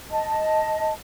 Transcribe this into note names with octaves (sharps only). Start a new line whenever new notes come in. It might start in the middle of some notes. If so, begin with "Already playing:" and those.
D#5 A5